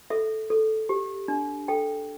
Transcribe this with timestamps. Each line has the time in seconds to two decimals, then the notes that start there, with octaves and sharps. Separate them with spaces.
0.10 A4 E5
0.50 A4
0.89 G4
1.28 D4
1.68 A4 G5